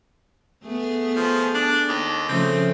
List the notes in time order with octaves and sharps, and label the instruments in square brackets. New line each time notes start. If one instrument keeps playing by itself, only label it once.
[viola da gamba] A3 B3 G#4
[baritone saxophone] F3
D4
D#2
[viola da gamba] C#3 F3 A3 [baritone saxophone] C4